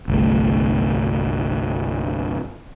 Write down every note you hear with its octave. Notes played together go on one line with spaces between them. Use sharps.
G1 C2 A3